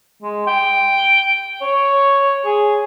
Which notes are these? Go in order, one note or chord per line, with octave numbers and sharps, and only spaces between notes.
G#3
G5
C#5
G#4